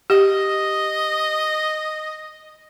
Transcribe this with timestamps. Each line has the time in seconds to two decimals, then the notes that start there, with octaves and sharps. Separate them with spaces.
0.10 G4 D#5